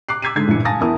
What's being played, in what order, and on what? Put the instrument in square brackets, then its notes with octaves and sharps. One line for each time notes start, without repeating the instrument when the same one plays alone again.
[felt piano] D6 F#6 C7
D6 E6 G#6 B6 C7 D#7
G#2 D3 G#6 C7
D#1 G2 E3 C#7
F5 G#5 A5 D#6 A6 A#6
E2 E4 A#4 A5 D#6